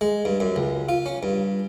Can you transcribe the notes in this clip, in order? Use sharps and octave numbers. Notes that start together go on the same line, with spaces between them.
G#3
G2
F#2
C#2
F4
C#4
G2